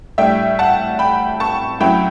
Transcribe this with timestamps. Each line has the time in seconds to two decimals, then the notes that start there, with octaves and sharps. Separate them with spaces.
0.18 A2 G3 D4 E5 G5
0.59 F#5 A5
0.99 G5 B5
1.40 A5 C#6
1.80 A2 F#3 C#4 E4 G5 B5